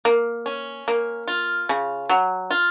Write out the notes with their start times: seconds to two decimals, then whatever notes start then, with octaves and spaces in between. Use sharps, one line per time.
0.05 A#3
0.46 C#4
0.88 A#3
1.28 F4
1.69 C#3
2.09 F#3
2.50 F4